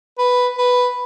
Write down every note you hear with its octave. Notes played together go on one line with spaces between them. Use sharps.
B4
B4